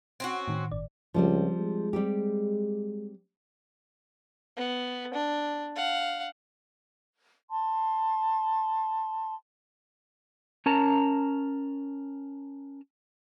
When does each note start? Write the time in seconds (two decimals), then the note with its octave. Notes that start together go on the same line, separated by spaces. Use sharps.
0.20 C4 C#4 F#4
0.48 A2 D#3
0.72 G1 D5
1.14 C#2 F3 G3 C4
1.58 G#3
1.93 G3 C4 G4
4.57 B3
5.14 D4
5.76 F5 F#5
7.50 A5 C6
10.66 C#4 A#4 A5 A#5